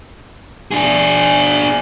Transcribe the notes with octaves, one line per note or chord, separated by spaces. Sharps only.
D4 G#4